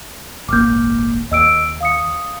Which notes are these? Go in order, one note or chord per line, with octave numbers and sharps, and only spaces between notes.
D#1 G#1 A#3 D6 F6 G6
D#2 D#5 E6 D7
F5 D#6 C#7